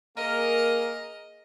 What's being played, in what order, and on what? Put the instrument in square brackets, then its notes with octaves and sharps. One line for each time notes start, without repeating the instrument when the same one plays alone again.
[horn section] A#3 G#4 A#4 [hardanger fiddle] D#5